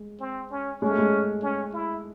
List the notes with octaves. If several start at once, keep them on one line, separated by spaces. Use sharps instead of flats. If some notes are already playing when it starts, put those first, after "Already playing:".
Already playing: G#3
C4
C#4
G#3 C#4
A3
G#3
C#4
E4